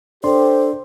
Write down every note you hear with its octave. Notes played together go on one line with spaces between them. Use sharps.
D4 G4 A4 C5 D5 C6